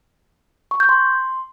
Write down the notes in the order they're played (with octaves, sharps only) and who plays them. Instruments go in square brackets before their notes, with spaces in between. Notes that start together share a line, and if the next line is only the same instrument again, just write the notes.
[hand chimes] C#6
G6
C6